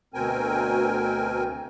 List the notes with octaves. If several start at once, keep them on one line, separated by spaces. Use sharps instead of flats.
D2 B2 C4 A#4 G5 G#5